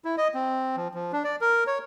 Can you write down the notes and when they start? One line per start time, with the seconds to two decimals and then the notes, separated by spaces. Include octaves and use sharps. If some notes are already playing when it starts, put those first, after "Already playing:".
0.05 E4
0.17 D#5
0.34 C4
0.76 F3
0.94 F3
1.12 D4
1.24 D5
1.41 A#4
1.67 C#5